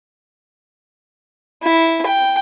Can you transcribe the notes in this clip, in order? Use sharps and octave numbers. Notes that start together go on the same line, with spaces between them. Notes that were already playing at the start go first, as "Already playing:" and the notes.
E4
G5